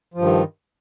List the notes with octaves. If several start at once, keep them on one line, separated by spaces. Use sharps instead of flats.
G2 D#3 F3